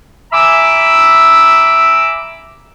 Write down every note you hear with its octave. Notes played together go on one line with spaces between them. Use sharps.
E5 G#5 A#5 B5 D6 E6